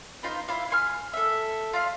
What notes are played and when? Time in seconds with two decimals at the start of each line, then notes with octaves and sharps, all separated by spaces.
0.23 B3 D#4 F4 C5
0.48 E4 F4 F5 D6
0.70 G#5 C6 F6
1.13 A4 E5
1.73 F4 D5 F5